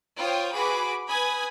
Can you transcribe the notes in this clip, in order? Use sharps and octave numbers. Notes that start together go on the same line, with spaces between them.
F4 C5 C#5 G5 D#6
F#4 G#4 B4 B5 D6
B4 G#5 B5 D#6 G#6